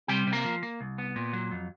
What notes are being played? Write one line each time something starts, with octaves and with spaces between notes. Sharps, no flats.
C3 G3 G4
C3
A#3 A#4
F3
A#3
C2
B3
A#2
F#3
F2